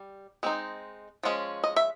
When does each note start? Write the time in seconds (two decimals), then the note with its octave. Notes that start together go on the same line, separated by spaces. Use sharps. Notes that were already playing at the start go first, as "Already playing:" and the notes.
Already playing: G3
0.43 G#3 C4 D#4
1.23 F3 G#3 C#4
1.64 D#5
1.76 E5